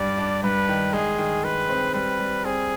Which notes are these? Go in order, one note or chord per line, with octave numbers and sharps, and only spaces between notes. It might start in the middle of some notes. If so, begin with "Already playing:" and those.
Already playing: G2 G3 D5
D4
G2 B4
D#3
G#3 G#4
D#3
D#3 B4
C4
G3 B4
G3
C4 G#4